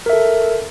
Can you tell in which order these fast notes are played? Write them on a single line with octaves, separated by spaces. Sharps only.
A#4 E5 A4